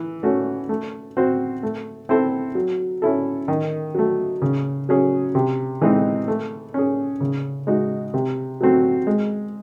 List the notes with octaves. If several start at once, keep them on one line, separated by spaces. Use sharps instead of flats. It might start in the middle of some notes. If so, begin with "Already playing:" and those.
Already playing: E3
A3 C#4 F#4
A3
C4 F#4 C5
A3
C4 E4 A4 C5
F#3
C#4 E4 A4
D#3
F#3 A3
C#3
F#3 C#4 G#4
C3
E3 G#3 C4 D#4
A3
C#4 G#4
C#3
G#3 D#4 F#4
C3
F#3 A3 C4 F#4
G#3